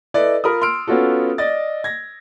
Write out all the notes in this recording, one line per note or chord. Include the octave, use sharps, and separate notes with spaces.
E4 A4 B4 D5 D#5
F4 A#4 B5 D#6
C6 E6 F6 D7
B3 C#4 F4 F#4 A4
D5 D#5 A6
G#6 A#6